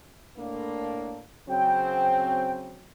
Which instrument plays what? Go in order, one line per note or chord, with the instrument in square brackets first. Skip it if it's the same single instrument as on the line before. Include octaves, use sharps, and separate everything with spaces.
[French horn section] A2 A#3 D4
[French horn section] C#3 F#3 C4 [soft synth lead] G5